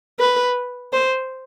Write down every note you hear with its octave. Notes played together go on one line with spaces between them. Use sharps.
B4
C5